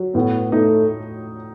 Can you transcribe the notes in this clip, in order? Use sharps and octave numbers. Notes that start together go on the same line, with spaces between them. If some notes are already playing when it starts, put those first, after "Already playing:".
Already playing: F#3
A2 B3
A3 D#4